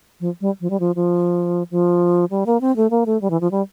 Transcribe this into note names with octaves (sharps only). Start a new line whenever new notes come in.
F3
G3
F3
G3
F3
F3
F3
G3
A#3
C4
A3
A#3
A3
G3
E3
F3
G3